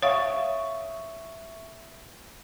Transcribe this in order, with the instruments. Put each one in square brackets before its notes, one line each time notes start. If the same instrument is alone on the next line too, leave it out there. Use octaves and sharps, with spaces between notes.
[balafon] C#5 F5 [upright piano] E5 C#6 D#6